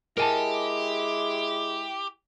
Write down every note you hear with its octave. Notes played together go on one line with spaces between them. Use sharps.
G#3 E4 G4 A#4 G#5 A5